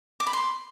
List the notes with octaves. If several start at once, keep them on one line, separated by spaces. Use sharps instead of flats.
D6
B5
C6